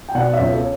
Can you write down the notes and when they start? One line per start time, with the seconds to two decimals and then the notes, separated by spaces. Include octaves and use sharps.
0.09 G5
0.15 B2 D5 F#5
0.34 C#5 E5
0.39 C#2
0.52 A4 C#5